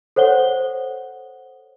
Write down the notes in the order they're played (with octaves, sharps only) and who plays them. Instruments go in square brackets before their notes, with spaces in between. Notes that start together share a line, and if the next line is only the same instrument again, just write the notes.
[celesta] A4 C5 C#5 F#5 G7